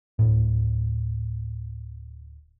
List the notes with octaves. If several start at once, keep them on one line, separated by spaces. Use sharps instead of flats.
D1 G#1 A2